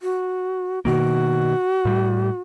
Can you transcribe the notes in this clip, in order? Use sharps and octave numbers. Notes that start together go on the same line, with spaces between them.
F#4
B2 D#3 A#3 F#4
A2 G3